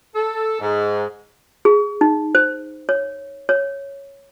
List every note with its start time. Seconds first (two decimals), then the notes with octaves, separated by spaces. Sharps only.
0.15 A4
0.61 G#2
1.65 G#4
2.01 D#4
2.35 C5
2.89 C#5
3.49 C#5